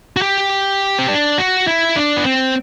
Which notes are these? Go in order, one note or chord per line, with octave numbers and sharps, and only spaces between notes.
F#4
G4
C4
D4
F#4
E4
D4
B3
C4